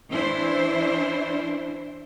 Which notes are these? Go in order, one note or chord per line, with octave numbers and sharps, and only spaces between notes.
E3 C#4 D4 E4 C5